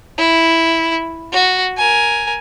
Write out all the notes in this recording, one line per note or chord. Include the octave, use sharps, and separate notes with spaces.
E4
F#4
A#4 G#5